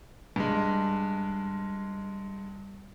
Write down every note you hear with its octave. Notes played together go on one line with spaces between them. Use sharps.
G2 G#3